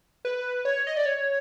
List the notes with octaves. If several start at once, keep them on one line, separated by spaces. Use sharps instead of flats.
B4
C#5
D#5
D5
C#5